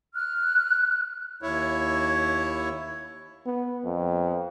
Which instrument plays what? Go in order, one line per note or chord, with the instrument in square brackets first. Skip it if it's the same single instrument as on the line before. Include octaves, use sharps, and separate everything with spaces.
[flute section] F6 F#6
[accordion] D#2 E4 C#5
[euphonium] B3
F2